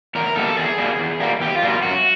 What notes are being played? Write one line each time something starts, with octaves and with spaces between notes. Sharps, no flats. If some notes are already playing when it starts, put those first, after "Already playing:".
E2 A#4
B2 G3 A#3 A4
E2 G#4
B2 G3 A#3
E2
B2 G3 A#3
E2 G4
F4
B2 G3 A#3
F4
F#2 F#4